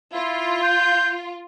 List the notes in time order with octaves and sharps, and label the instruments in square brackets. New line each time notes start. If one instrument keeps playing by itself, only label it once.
[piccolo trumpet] E4 [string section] F4
[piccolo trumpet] G6